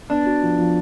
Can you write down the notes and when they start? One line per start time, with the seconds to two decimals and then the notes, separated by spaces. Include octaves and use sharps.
0.10 B3 D4
0.26 F#4
0.42 F3
0.59 F3